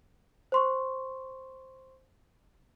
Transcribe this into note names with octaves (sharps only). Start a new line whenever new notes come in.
C5 C6 C#6